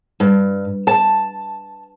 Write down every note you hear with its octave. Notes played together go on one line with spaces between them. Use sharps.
G2
A5